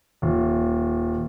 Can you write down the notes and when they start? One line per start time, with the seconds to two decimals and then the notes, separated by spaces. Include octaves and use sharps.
0.22 D#1